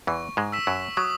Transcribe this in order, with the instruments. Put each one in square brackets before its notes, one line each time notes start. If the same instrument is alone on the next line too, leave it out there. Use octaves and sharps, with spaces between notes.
[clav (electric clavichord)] E2 E3 [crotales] C#6
[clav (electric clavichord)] G#2 G#3
[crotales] E6 B6 E7
[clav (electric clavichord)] F#2 F#3
[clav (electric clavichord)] F#3 [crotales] D#6